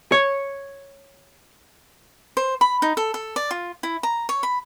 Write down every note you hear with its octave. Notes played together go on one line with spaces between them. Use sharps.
C#5
C5
B5
D#4
A4
A4
D5
F4
E4
A#5
C#5
B5